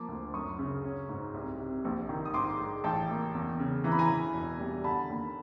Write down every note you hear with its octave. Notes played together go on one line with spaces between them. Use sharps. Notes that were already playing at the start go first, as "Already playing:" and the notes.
Already playing: F3 A#3 D6
D2
F#2 C#6 D#6
C#3
C#4
G#2
C2
C3
A#1
D#3
D#6
G#2 C6 D6
G#3
A1 G5 A5
A#3
E2
C#3
E3 A#5
B5
G#5 A#5
E3
E1
G3
D3 A5 B5
D#2